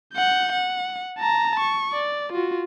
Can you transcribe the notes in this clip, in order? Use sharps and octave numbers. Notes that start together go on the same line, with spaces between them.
F#5 G6
F#5
A5 A#5
C#6
D5
F4 F#4